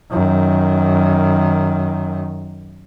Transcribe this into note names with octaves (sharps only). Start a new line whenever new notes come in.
F#2 D#3